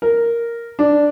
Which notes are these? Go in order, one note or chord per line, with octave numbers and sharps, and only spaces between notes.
A#4
D4